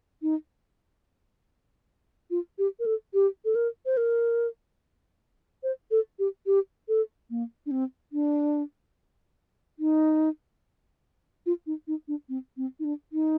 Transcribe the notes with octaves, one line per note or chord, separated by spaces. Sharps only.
D#4
F4
G4
A#4
A4
G4
A4
A#4
C5
A#4
C5
A4
G4
G4
A4
A#3
D4
C4
D4
D#4
F4
D#4
D#4
D4
C4
C4
D#4
D4
D#4